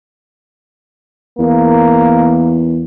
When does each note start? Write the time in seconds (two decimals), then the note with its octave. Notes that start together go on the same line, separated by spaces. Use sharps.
1.39 E2 A#3